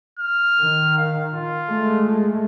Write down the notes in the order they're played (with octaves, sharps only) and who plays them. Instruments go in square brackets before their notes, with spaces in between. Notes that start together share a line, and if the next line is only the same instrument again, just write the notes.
[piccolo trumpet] F6
[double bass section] D#3
[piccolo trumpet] F5
F4
[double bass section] G#3 A3